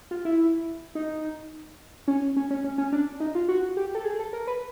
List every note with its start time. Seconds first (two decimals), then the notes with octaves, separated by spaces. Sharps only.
0.11 F4
0.25 E4
0.95 D#4
2.08 C#4
2.36 C#4
2.50 C#4
2.64 C#4
2.78 C#4
2.92 D4
3.20 D#4
3.35 F4
3.48 F#4
3.77 G4
3.95 A4
4.05 G#4
4.19 A4
4.33 A#4
4.47 B4